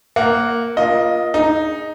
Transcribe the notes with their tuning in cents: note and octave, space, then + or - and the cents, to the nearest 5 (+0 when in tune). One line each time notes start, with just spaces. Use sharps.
A#3 +0 F#5 +0
A#3 +30 F4 +0 D#5 +5
D#4 +0 G#4 +5